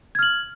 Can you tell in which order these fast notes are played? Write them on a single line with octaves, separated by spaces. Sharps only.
G#6 F6 F#7